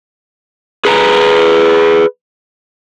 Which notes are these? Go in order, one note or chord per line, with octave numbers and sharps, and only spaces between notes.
G#4 B4 G#5 A#5